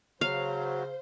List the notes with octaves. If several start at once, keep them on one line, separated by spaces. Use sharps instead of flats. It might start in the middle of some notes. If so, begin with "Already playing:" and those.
C#3 F#3 C5 F5